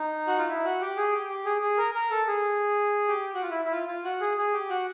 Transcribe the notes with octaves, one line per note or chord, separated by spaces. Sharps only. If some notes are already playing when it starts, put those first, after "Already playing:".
Already playing: D#4
F#4
F4
E4
F#4
G4
G#4
G4
G4
G#4
G#4
A#4
A#4
A4
G#4
G4
F#4
F4
E4
E4
F4
F4
F#4
G#4
G#4
G4
F#4